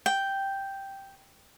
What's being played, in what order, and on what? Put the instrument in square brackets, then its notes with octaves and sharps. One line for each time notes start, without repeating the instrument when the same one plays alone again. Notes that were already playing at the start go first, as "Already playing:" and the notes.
[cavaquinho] G5